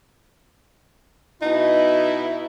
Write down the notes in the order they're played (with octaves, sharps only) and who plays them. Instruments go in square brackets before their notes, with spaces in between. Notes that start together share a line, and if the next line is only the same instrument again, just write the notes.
[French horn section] B2 E4 [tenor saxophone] D#4